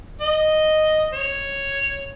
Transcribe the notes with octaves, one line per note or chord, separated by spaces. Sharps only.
D#5
C#5